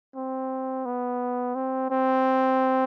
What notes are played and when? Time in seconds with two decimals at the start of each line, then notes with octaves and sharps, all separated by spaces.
0.16 C4
0.86 B3
1.56 C4
1.90 C4